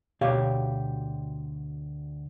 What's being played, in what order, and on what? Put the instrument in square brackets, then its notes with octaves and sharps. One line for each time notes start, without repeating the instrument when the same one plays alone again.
[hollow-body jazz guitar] D2 B2 G4 C#5 F5